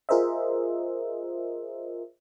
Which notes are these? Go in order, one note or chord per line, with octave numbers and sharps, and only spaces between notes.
F4 G#4 A#4 C5 D#5 E5